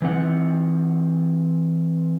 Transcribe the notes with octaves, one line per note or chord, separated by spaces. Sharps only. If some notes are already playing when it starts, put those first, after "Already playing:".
E3 C4 F#5